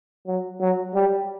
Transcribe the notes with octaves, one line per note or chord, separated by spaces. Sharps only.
F#3
F#3
G3